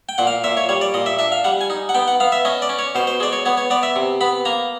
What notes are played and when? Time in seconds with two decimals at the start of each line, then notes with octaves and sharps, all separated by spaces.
0.09 G5
0.18 A#2 F#5
0.27 F5
0.44 A#2 E5
0.57 C#5
0.69 G3 C#5
0.81 D5
0.94 A#2 D#5
1.06 E5
1.19 D4 E5
1.32 F5
1.44 G3 F#5
1.61 G#5
1.70 D#4
1.89 F#5
1.94 B3 G5
2.08 F#5
2.20 B3 F5
2.32 E5
2.45 C#4 D#5
2.62 D5
2.69 C#4
2.79 C#5
2.95 B2 C5
3.07 C5
3.20 G#3 D5
3.33 C#5
3.45 B3 C#5
3.57 C#5
3.70 B3 D5
3.83 E5
3.96 C3
4.21 B3 B5
4.45 A#3 A#5